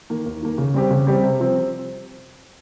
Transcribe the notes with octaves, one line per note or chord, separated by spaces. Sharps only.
D#3 A#3
D#2
D#3 A#3
C#3
G3 C4 G4
C#3
G3 C4 G4
C3
F3 C4